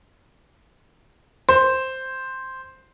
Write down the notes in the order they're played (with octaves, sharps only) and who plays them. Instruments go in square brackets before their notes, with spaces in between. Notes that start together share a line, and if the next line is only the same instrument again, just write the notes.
[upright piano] C5